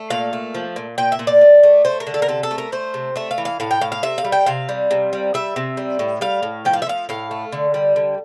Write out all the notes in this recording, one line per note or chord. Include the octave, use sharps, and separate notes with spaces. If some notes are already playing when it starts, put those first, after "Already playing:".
Already playing: A3
A#2 F5
A3
F3
A#2
A#2 G5
E5
A#2
D5
A3
A3
A3 C5
A#4
D3
A4
A#4
C3 A4
A4
A3
A#4
A3 C5
C3
A3 E5
F5
E3
F5
A2 F5
G5
A2 F5
F5
C3 E5
F5
G3
G5
C3 F5
G3
C3
G3
G3 E5
C3
G3
A2
G3 F5
A2
F3 G5
F5
E5
F3 F5
A2 F5
A3
D3
G3
D3